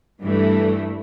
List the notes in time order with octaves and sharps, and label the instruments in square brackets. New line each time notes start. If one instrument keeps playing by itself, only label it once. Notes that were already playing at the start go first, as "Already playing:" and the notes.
[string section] G2 E3 A3